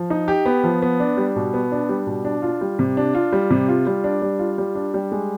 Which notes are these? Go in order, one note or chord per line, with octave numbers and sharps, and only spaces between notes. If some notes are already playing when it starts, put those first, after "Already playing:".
Already playing: F3
D#4
G4
B3
F3
B3
D4
G3
B2
B3
D4
G3
B2
D4
F4
G3
C3
D4
F4
G3
C3
F4
G3
D4
G3
F4
G3
D4
G3
G#3